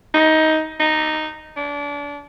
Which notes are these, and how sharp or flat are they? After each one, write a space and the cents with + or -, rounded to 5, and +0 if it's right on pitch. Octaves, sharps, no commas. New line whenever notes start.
D#4 +15
D#4 -5
D4 -30